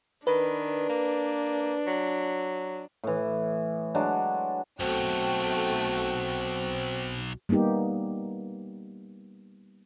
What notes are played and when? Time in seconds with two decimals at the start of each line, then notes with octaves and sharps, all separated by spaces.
0.27 D#3 D4 B4
0.89 A#3
1.87 F#3
3.03 A2 E3
3.95 F#3 G#3 D4
4.80 B1 A3 C4 F#4 G5
7.49 G3 A#3 B3 D#4 G4